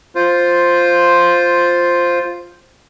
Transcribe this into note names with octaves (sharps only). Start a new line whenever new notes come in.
F4 C5